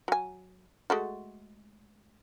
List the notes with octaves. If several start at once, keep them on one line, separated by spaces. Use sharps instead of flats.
F#3 G#5
G#3 A3 F#4